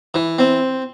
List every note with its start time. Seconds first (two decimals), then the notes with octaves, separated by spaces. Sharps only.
0.14 E3
0.39 C4